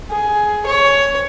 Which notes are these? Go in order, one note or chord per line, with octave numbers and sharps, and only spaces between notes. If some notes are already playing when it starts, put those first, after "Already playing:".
G#4
C#5